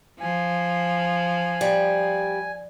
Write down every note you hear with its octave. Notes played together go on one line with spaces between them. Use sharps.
F3 G#5
G3